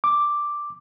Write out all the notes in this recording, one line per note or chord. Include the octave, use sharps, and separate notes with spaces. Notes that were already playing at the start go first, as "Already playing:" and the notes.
D6